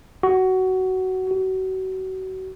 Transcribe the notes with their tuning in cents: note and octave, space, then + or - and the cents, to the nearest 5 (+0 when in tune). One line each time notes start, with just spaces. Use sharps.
F#4 +15
F#4 +30